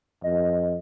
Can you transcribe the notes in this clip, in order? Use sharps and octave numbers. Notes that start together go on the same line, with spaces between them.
F2 D#5